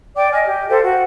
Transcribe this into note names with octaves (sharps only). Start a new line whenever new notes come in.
D5 G5 D6
D#5 G#5 F6
G4
G4 A4 C5 F5
F#4